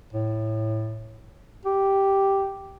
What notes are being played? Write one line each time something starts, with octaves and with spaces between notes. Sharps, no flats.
A2
G4